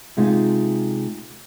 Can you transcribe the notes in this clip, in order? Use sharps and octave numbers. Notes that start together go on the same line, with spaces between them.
C3 G#3 D#4 F4